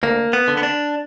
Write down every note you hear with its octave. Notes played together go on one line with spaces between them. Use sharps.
D2 A#3
B3
D3
B3
D4